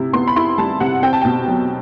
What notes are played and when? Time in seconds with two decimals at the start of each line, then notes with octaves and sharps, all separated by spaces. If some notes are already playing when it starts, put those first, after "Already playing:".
Already playing: C3 E4
0.13 B3 C6
0.27 B5
0.36 E4 C6
0.58 G3 A5
0.80 C3 F#5
1.02 C4 G5
1.13 A5
1.21 B2 G5
1.48 F#3